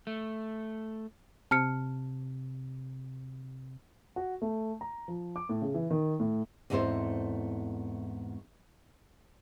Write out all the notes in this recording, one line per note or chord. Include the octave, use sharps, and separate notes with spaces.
A3
C3 A5 F6 C#7
F#4
A3
A#5
F3
D6
A2
C#3
E3
D#3
A2
E2 G#2 A3 C4 E4 C5